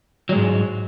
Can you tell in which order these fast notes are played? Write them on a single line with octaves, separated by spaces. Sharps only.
F#3 G#3 G#2